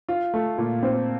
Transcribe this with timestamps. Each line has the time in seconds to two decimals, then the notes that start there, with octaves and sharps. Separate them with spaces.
0.09 F4
0.34 A3
0.58 A#2
0.83 C4